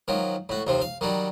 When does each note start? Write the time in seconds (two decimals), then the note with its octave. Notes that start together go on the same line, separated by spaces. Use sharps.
0.08 D#3 F3 F#3
0.49 A2 F#4
0.67 D#2 C3 F3
0.81 F5
1.01 D#3 F#3 G3